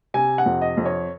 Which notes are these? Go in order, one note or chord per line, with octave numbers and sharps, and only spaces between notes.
C3 G#5
F#5
F2
D#5
F2
C#5